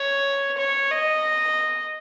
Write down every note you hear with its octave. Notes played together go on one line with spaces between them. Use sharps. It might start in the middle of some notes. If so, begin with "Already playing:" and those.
Already playing: C#5
C#5
D#5